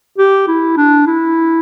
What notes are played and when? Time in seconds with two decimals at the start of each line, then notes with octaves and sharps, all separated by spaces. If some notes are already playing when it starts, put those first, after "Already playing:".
0.18 G4
0.48 E4
0.77 D4
1.07 E4